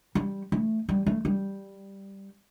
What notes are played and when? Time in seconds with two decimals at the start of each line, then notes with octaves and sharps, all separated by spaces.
0.15 G3
0.52 A3
0.89 G3
1.06 A3
1.25 G3